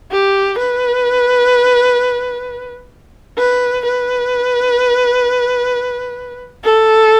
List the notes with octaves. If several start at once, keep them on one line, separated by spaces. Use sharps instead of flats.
G4
B4
B4
B4
A4